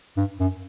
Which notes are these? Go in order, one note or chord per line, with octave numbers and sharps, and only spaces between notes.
G2
F#2